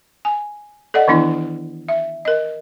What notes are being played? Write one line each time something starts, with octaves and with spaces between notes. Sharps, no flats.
G#5
A4 D5 D#5 F#5
D#3 E3 B3 D4 E4
E5
A#4 D#5